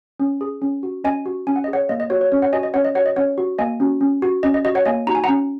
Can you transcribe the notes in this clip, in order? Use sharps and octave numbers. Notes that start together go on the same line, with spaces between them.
C#4
G#4
C#4
F#4
C#4 D#5 G#5
F#4
C#4 G#5
F#5
D#5
G#4
C#5 F#5
A#3 D#5
D#5
F#4 C#5
C#5
C#4 C#5
C#5 F#5
F#4 D#5 G#5
D#5
C#4 C#5 F#5
D#5
F#4 C#5 F#5
D#5
C#4 C#5 F#5
F#4
A#3 D#5 G#5
C#4 F#4
C#4
F#4
C#4 D#5
D#5
F#4 D#5
C#5 F#5
A#3 D#5 G#5
D#4 F#4 A#5
G#5
C#4 F#5 A#5